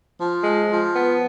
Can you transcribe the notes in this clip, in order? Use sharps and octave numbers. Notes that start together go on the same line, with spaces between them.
F3
G#3
F3
B3